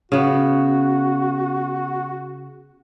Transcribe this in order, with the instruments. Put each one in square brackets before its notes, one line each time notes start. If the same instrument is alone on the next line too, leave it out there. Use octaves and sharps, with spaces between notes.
[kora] C#3 B3 [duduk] F#4